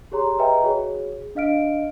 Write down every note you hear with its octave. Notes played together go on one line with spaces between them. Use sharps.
G4 G#4 C#5 A#5 C6
B4 D#5 E5 G5 G#5 A#5
F#4 G#4 C#5
D4 D#5 F5 F6 D7